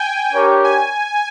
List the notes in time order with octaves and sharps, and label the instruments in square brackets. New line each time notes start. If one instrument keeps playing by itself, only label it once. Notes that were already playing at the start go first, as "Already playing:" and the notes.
Already playing: [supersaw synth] G5 G#5
[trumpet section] D4 G4 A#4 C#5
[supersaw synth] G#5